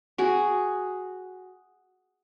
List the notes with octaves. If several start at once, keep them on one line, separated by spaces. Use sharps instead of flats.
F#4 G#4